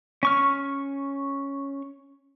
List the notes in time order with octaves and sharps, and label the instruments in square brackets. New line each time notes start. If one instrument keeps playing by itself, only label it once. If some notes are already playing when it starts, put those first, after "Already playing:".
[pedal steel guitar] C#4 C#6 F6